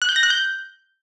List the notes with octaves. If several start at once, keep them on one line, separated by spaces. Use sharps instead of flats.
F#6
G6
A#6
F#6
G6